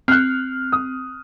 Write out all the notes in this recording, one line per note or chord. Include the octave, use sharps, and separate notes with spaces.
C4 F6 F#6
D#6